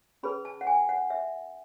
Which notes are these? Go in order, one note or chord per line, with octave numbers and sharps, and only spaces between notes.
C#4 G#4 B4 B5
A5
F#5
G#5
F#5
E5